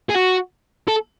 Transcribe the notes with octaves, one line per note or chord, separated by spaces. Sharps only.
G#4
F#4
A4